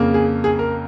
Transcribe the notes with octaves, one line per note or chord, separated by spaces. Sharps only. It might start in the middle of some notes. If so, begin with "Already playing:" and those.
Already playing: F2 C#3 A#3
G#4
G#4
A#4